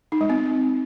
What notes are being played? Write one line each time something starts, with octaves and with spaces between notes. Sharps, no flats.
D#4
G#3
C4